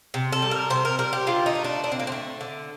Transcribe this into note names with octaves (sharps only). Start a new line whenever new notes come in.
C3
A4
G3
A#4
C3 C5
A#4
G3 A#4
G4
D3 F4
D#4
A3
D4
D3 D4
C4
A#3
C4
A3
D3